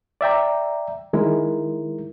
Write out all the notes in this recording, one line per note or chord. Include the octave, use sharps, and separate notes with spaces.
D5 E5 G5 A#5
D#3 G#3 E4 A#4